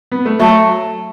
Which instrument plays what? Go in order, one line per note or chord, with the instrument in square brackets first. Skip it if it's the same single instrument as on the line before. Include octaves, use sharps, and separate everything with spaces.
[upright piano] B3
A3
[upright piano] F#3 [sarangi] A3